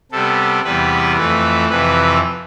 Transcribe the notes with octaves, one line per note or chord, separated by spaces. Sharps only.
C3 G3 B3 A4
E2 C3 G3 B3 B4
F2 E3 A3 B4
F2 C3 E3 B4